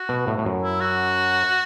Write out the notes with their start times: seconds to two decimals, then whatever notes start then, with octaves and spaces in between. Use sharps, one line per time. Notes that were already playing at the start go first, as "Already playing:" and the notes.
Already playing: F#4
0.09 B2
0.27 A2
0.38 A2
0.45 F#2
0.63 E4
0.81 F#4